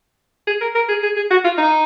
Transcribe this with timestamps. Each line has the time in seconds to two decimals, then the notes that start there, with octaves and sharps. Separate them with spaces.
0.47 G#4
0.61 A#4
0.75 A#4
0.89 G#4
1.03 G#4
1.16 G#4
1.31 F#4
1.44 F4
1.58 D#4